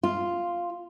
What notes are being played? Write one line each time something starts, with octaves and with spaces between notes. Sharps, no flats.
F4